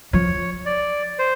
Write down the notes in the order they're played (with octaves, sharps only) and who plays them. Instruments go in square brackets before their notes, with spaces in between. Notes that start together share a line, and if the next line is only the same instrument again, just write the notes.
[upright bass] F3 [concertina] C#5
[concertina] D5
C5